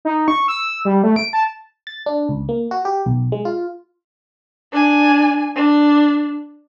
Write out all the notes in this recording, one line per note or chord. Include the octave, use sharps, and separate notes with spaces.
D#4
C#6
E6
G3
A3
D7
A5
A6
D4
C#2
A#3
F#4
G4
B1
G#3
F4
D4 G#5
D4